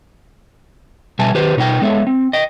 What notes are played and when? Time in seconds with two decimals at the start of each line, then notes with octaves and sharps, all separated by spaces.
1.19 B2 G3 E5 G#5 A5
1.34 D#3 G4 B4 C5
1.57 B2 D#4 A#4 C5 G5
1.82 G#3 B3 A4 C#5 E5
2.07 C4
2.33 D#5 G5